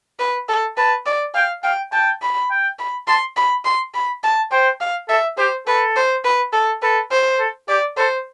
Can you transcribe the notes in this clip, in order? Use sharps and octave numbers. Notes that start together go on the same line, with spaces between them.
B4
A4
B4 A5
D5
F5 G5
F5 G5
G5 A5
B5
G5
B5
A5 C6
B5
C6
B5
A5
C5 G5
F5
A4 E5
G4 C5
A4 B4
C5
B4
A4
A4 B4
C5
A4
G4 D5
A4 C5